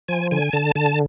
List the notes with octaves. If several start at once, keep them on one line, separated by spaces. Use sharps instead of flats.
F3 G#5
D3 G#5
D3 A5
D3 A5